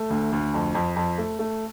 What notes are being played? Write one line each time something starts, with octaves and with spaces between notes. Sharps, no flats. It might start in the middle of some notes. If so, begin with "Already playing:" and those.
Already playing: A3
D2
D2
F2
F2
F2
A3
A3